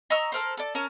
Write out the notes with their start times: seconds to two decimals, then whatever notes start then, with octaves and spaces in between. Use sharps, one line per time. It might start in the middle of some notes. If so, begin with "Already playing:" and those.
0.10 D#5 A#5 C#6 E6
0.32 A4 A#4 C5
0.57 A4 D5
0.75 C#4 A#4 A5